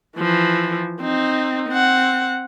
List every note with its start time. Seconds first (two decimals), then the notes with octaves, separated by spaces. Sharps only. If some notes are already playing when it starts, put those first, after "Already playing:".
0.18 E3 F3
1.01 C4 D#4
1.68 C4 F#5